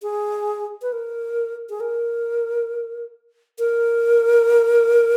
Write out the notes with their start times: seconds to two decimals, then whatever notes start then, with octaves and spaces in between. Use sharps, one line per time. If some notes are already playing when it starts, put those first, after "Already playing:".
0.03 G#4
0.82 B4
0.92 A#4
1.70 G#4
1.80 A#4
3.59 A#4